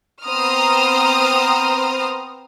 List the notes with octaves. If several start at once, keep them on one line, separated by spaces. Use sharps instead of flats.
B3 C4 C5 A#5 D#6 F6